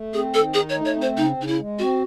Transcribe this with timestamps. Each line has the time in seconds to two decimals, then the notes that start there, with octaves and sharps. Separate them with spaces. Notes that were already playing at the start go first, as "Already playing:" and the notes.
Already playing: A3
0.14 C4 G#4
0.33 D#3 A4
0.54 D#4 G#4
0.70 C#5
0.75 A3
0.85 C#5
0.96 C4
1.02 C5
1.16 C#3 D#4
1.37 C#3 D#4
1.47 E4
1.59 G#3
1.79 C4 F#4